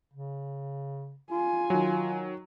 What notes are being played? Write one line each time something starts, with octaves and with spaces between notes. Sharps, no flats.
C#3
F4 G#5
D#3 F#3